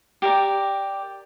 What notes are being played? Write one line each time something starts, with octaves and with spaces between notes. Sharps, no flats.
G4 A#4 D5